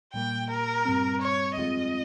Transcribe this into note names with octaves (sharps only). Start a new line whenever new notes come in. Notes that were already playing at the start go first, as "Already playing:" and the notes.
A#2 G3 A#3 G5
A#4
G2 G3 C4
C#5
F2 D#3 G#3 C4 F4 D#5